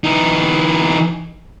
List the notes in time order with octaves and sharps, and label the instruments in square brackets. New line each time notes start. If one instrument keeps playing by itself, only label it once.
[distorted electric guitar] E3 D#4